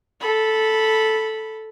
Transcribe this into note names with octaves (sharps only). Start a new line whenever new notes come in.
A4 B5